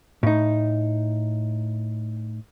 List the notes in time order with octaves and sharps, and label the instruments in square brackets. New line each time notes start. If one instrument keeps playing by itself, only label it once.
[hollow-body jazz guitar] A2 D#4